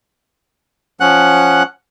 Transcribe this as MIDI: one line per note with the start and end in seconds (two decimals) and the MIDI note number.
1.00 1.63 53
1.00 1.63 61
1.00 1.63 78
1.00 1.63 90